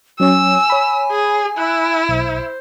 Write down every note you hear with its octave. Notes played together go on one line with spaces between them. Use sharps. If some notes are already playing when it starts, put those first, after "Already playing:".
F#3 C#4 C#5 G#5 E6
C#5 B5
G#4
E4 B5 E6 F#6
B1 C5